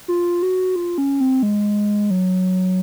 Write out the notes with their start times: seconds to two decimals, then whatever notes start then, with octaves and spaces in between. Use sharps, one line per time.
0.08 F4
0.43 F#4
0.76 F4
0.98 C#4
1.20 C4
1.43 G#3
2.10 F#3